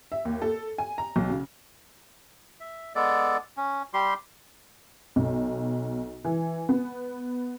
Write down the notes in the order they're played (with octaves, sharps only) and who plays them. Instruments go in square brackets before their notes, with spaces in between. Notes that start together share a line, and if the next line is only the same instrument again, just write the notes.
[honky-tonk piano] E5
D#2
A4
G#5
A#5
B1
C#3
[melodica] E5
G#3 B3 A4 D5
C#4
G3 G4 C6
[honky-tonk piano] B1
E3
B3